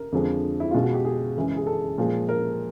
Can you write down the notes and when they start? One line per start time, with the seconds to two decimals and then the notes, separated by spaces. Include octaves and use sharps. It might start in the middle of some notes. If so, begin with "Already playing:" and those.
Already playing: A#4
0.12 F2 D3 F3 G#3
0.60 E4
0.71 B2 G#3 F4
0.83 F#4
0.94 G4
1.05 G#4
1.36 F#2 C#3 E3 G#3
1.57 G#4
1.67 A4
1.98 A#2 F3 G#3
2.29 A#4